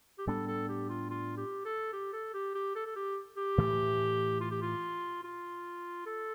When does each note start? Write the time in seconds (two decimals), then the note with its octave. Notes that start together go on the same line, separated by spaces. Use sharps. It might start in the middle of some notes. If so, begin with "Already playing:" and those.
0.18 G4
0.27 A2 G3 B3 D4 A4
0.47 A4
0.69 G4
0.89 F4
1.10 F4
1.37 G4
1.65 A4
1.93 G4
2.13 A4
2.34 G4
2.55 G4
2.75 A4
2.86 A4
2.96 G4
3.37 G4
3.58 A2 E3 A3
4.40 F4
4.51 G4
4.61 F4
5.23 F4
6.06 A4